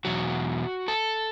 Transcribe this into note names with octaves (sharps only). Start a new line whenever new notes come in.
E2 B2 F#3 F#4
A4